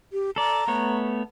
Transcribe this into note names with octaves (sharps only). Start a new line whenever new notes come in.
G4
A4 D5 A#5
A3 B3 C#5